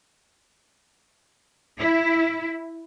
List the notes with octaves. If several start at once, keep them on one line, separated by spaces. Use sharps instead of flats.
E4